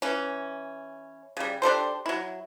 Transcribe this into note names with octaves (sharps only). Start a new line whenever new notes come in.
E3 C#4
C#3 G3
D4 G4 A4 C5
F#3 E4